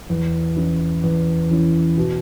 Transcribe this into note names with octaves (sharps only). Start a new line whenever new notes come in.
E2
E3 C#4 E4
E2
E3 C#4 E4
B2